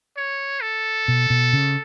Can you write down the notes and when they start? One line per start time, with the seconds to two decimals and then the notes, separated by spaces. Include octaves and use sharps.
0.17 C#5
0.62 A4
1.08 B2
1.30 B2
1.53 C#3